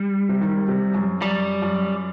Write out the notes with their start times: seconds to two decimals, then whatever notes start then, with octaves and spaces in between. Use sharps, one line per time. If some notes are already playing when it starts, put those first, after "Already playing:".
Already playing: G3
0.29 C3
0.41 D#3
0.68 C3
0.94 F#2
1.22 F#2 G3
1.62 F#2